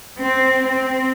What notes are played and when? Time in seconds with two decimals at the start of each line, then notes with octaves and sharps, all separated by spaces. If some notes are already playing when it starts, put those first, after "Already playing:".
0.21 C4
0.68 C4